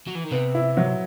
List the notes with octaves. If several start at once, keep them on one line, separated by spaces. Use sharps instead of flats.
F#3
E3
D#3
C3 B3
E4
F#3